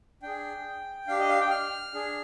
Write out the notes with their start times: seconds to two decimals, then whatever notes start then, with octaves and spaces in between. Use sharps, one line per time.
0.22 D4 G#4 G5
1.08 D4 G4 F5
1.19 D#5
1.29 F5
1.41 G5
1.50 F6
1.94 D4 G#4